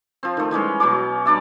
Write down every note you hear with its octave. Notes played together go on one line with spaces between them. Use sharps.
F3 C4
D#3 A3
E3 G3 G#3 C#4
B2 F#3 C#4 D6
G3 D4 D5 E5